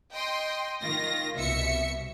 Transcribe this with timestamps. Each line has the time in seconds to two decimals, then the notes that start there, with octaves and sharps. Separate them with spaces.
0.14 D#5 G5 C6
0.82 D#3 F4 A#6
1.36 C2 B2 E5 C#7